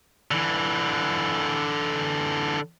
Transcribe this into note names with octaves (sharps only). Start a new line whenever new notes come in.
D3 E3